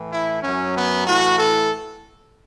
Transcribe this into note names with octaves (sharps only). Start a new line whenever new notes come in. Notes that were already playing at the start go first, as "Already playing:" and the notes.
Already playing: A2 E3
E4
F#2 F#3 C#4
B3
A2 E3 F#4
A4